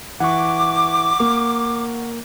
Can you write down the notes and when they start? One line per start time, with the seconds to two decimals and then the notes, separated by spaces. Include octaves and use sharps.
0.20 E3 F#5 C#6 D6
1.20 A#3